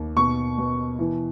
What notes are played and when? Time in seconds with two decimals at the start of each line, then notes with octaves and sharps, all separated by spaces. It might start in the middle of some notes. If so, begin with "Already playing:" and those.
Already playing: D#2
0.16 B2 C#6
0.58 B2
0.99 E3